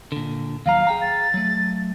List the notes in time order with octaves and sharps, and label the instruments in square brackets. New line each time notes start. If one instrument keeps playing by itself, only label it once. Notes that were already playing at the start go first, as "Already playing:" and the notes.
[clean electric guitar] A#2 D3
[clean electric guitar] D#2 F#3 A#5 [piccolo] F5
[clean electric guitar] G#4 G5 A#5
[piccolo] A6
[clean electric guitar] F#3 A3